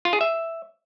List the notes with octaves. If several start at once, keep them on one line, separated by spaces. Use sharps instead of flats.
F4
G#4
E5